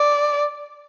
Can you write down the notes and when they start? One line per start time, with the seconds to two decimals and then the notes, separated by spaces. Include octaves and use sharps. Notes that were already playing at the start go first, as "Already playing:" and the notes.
Already playing: D5